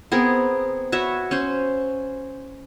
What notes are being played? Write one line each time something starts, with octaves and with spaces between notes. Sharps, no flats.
B3 C4 G#4 A#4
F#4 B4 C#5 E5
C#4 C5